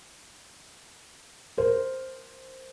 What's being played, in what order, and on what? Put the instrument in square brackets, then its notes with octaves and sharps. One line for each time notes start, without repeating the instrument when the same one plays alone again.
[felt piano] A#4 C5